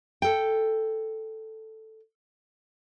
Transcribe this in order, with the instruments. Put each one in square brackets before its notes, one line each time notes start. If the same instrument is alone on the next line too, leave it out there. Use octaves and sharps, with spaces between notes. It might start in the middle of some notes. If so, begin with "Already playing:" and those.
[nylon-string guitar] A4 G5